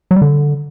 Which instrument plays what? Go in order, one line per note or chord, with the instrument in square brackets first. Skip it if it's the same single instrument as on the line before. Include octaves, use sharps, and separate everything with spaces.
[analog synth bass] F#3
G3
D3